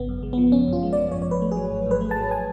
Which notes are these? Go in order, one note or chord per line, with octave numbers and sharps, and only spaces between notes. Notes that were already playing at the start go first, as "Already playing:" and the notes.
Already playing: G#1 C#3 B3
F#2
G#3
F3 B3
G#1 C#4
F#2
F4
G#3
F3 D5
G#1 C#5
C#5
G#2 B4
A3
F#3 G#4
G#1
G#2 B4
A3
A5
F#3
G#5